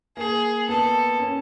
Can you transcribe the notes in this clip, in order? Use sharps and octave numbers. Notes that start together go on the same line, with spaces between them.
A#3 G#4
B3 A4
C#4